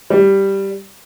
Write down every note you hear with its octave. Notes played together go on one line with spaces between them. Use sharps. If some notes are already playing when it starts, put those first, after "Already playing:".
G3